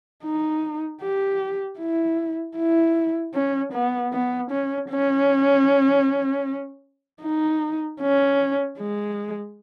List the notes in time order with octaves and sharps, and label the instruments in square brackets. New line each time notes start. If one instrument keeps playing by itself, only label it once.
[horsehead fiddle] D#4
G4
E4
E4
C#4
B3
B3
C#4
C#4
D#4
C#4
G#3